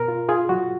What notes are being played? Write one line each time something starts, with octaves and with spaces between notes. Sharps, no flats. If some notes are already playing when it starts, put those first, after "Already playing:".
Already playing: B2 A#4
F4
F4 G#4
F#3 F#4